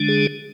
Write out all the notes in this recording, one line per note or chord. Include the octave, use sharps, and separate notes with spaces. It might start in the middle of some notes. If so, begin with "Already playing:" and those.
Already playing: D3 G#3 D4
G#4